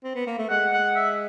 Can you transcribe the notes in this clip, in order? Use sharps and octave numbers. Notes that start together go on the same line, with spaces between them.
C4
B3
A#3
A3
G#3 F#5
F#5
E5